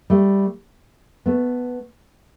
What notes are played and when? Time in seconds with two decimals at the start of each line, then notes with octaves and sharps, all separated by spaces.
0.10 G3 A3
1.26 A3 B3